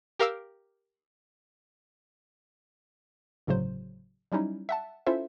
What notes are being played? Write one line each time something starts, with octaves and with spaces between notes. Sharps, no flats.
G4 A#4 F5 D6 E6
G1 A2 C#3 F#3 C5
F#3 G3 C#4 D#4 E4
E5 F#5 A5
C#4 E4 F4 A4 C5 E5